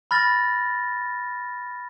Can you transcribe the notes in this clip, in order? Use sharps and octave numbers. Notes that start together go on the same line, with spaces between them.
B5 F6 A6 A#6